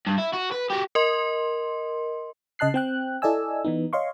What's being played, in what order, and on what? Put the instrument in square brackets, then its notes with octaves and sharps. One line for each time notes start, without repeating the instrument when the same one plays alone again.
[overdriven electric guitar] G2
E4
F#4
B4
F#4 G4
[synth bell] A#4 D#5 C6
[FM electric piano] C#3 D#5 A5 F#6 C7
C4 G5 F#6
E4 A4 D5 D#5 G#5 E6
E3 B3 D#4
C#5 D#5 F5 C6 C#6